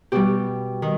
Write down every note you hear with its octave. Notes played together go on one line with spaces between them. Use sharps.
B2 G3 G4
D#3